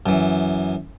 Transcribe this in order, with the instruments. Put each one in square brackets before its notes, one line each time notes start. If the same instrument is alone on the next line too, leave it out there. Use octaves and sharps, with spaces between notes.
[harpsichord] F#2 E3